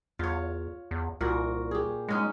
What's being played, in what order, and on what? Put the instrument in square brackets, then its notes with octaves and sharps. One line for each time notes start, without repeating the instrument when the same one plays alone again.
[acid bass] E2 [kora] F4 C#5
[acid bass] E2
[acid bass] C2 [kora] A#2 F#4 A#4
[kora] G4 G#4
[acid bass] G#3 [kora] B3 C#4 D#4